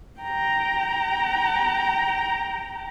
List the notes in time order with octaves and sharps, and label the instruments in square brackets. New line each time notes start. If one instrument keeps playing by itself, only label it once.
[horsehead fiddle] G5 A#5